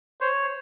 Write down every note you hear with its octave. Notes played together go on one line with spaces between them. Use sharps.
C5 C#5